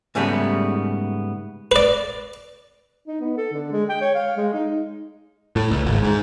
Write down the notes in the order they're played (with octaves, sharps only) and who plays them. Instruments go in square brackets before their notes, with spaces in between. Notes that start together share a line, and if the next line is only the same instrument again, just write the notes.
[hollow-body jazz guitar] G#2 C#3 G3 A3 B3
[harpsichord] B4 D5
[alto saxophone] D#4
B3
A4
D3
G#3
G5
C#5
F5
G#3
D#4
[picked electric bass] A2
C#2
G#1
G#2